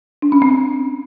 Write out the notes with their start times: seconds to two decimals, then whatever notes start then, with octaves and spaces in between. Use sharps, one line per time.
0.22 D4
0.32 C#4
0.42 C4